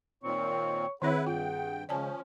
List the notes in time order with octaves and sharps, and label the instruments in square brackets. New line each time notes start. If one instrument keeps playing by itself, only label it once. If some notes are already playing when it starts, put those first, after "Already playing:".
[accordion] A#2 D#3 C4 [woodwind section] C#5 C#6
[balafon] D#3 C4 C#5 [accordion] E4 B4 [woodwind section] G#4 F#5
[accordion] G2 G5 [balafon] F4
[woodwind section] C#3 G#3 [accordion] F3 C#4 [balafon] D5 G#5 A5